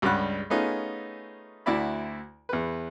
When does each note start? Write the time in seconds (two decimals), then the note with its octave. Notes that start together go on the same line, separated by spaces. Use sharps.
0.02 C#2 G2 G3 D5 F#5 F#6
0.50 A3 B3 C#4 D#4 F4 G#4
1.66 D2 E4 F#4 D5 E5 B5
2.49 E2 B4